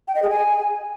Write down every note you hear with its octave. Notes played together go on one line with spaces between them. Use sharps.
G5
D#5
G#4
G#5